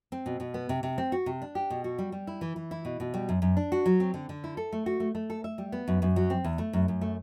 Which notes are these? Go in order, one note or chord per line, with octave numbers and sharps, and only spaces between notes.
C4
B2
B2
B3
C3
C3
C4
F#4
C3
D4
G4
B2
F#4
G3
G3
E4
E3
E3
E4
B2
B2
G3
F#2
F#2
D4
F#4
F#3
C4
D3
D3
E4
A4
A3
F#4
A3
A3
A4
E5
G3
B3
F#2
F#2
F#3
C4
E2
A3
F#2
F#2
A3